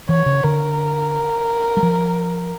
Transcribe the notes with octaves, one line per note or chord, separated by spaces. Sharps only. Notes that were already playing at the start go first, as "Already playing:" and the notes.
E3 C#5
C#3
D3 A#4
G3
F3